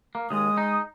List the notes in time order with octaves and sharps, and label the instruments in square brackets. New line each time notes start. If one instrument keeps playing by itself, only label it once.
[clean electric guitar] A#3
[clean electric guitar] D#2 [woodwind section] G#3 D#6
[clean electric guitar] D#4